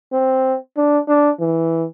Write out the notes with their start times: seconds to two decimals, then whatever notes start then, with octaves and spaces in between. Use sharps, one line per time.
0.12 C4
0.77 D4
1.08 D4
1.40 E3